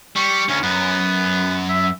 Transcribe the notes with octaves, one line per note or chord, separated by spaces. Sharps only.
G3 C#6
D2 C#4
F#2 B3
E5